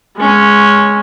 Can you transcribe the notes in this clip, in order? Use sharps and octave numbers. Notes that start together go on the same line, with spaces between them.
G#3 C#4